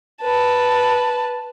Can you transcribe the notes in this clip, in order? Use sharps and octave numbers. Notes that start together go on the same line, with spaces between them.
B4 A5